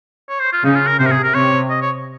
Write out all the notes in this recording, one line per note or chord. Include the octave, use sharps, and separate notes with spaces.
C#5
C5
F4
C#3 D#4
F4
A#4
C3 C5
A#4
G#4
A#4
C3 C#5
D#5
C#5